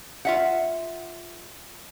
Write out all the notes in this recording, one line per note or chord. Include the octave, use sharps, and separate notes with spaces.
F4 E5 F#5